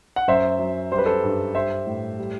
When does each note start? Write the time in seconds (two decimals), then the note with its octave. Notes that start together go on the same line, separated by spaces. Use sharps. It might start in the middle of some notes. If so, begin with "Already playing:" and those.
0.16 F#5
0.28 F#2 C5 E5
0.59 F#3
0.92 G3 C5
0.98 B4
1.06 A4 C5
1.24 G2
1.55 G3 C5 E5
1.87 A2
2.19 G3